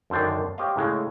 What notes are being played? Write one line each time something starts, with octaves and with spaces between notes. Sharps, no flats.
F#2 D3 D#3 C5 D5
G4 C5 C#5 D#5 F5
A2 C#3 G#3